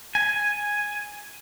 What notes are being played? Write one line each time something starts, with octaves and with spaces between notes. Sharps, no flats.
G#5